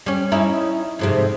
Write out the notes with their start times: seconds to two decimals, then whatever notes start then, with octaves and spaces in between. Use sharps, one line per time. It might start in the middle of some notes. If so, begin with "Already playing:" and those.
0.06 G3 C#4
0.32 C#4 D#4 E4
0.99 F2 G#2 C3